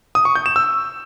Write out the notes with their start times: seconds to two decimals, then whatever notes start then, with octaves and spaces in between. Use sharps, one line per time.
0.15 D#6
0.25 C#6
0.35 G6
0.46 E7
0.56 E6